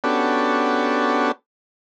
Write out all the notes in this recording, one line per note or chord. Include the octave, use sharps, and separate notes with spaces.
B3 C#4 D4 F#4 G4 A4